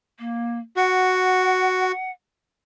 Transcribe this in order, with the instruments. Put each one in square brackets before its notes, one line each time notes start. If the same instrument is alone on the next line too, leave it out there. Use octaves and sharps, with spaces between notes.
[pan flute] A#3
[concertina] F#4 [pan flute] F#5